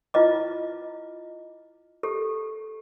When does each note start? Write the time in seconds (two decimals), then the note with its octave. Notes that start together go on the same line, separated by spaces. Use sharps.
0.14 E4 F4 B4 D#5 D6
2.03 G4 A4